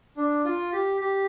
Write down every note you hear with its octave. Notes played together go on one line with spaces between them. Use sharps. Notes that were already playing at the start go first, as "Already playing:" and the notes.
D4
F4
G4
G4